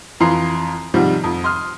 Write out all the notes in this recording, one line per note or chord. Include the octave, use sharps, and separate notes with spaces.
F2 E3 F4 A#5 C6 C7
G#2 C3 D#3 F3 G3
F2
C6 D#6 F6